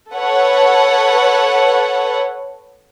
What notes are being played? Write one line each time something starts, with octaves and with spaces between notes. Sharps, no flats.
A4 B4 C#5 F#5